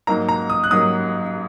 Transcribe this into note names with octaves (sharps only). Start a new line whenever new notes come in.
G#2 F#3 A#3 D#4 A#5
A#5
D#6
F#6
G#2 F#3 A#3 D#4 D#6